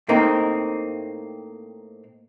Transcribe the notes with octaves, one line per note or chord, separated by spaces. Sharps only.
A2 A3 A#3 C4 D#4